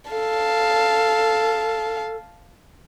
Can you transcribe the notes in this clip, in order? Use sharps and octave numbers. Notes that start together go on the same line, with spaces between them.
A4 F5 A5